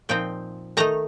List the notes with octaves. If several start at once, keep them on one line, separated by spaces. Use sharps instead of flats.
A#2 F3 C4 D#4 G5
D#3 A3 D#4 A#5